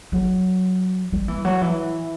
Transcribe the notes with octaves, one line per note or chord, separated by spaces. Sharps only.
F#3
G3
E3
F#3
E3